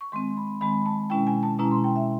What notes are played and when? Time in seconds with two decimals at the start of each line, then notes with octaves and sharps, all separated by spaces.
0.01 C#6
0.12 D#3 G#3 C4 C6
0.37 B5
0.61 D#3 G#3 C4 B5
0.86 A5
1.10 B2 G#3 C#4 E4 G5
1.27 G#5
1.43 A5
1.59 B2 G#3 C#4 E4 A#5
1.71 C6
1.84 G5
1.96 E5